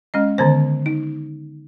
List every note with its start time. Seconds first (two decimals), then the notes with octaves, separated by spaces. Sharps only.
0.14 G#3 C#4 D#5
0.38 D3 D#3 B3 C5
0.86 D#4